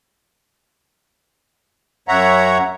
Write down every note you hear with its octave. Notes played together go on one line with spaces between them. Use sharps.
F#2 C#5 E5 F#5 A#5